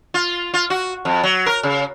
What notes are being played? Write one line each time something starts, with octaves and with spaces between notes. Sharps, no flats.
F4
F4
F#4
F2
F#3
A#4
C#3